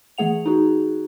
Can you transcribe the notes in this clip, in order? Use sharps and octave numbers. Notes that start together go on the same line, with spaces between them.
E3 A3 G#4 F#5 F7
D#4 F#4 G#4